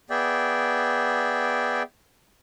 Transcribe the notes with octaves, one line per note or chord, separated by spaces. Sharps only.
B3 G#4 D5 E5 G5